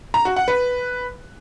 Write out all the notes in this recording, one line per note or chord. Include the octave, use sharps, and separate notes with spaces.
A#5
F#4
F#5
B4